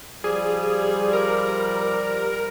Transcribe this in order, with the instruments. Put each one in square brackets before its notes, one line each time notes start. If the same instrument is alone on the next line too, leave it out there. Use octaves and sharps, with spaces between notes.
[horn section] F3 G3 [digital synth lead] G#4
[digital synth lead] A#4